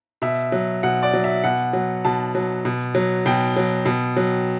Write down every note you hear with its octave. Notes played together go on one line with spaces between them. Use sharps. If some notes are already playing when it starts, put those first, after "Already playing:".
B2 E5
F#3
B2 F#5
D5
F#3
E5
B2 F#5
F#3
B2 A5
F#3
B2
F#3
B2 G5
F#3
B2
F#3